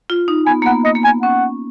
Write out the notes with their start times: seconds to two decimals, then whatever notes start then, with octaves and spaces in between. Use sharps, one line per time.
0.10 F4
0.28 D#4
0.46 B3 G#5
0.62 A#3
0.66 B3 F#5
0.85 A#3 D#5
0.95 A#3
1.03 B3 G#5
1.23 C#4 F#5